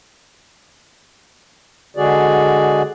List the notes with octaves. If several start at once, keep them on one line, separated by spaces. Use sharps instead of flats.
D3 G#3 F#4 G#4 D5